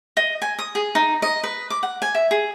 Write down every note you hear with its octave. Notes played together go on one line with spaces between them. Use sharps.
D#5
G#5
D#6
G#4
D#4
D#5
B4
D6
F#5
G#5
E5
G#4